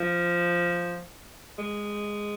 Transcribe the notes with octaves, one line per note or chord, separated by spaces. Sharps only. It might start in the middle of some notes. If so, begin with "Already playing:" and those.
Already playing: F3
G#3